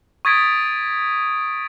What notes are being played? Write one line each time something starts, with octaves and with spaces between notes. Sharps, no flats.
C#6 D#6 G#6 A6 B6 D7